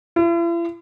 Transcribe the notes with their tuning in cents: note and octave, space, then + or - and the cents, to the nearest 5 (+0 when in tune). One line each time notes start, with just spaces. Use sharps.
E4 +45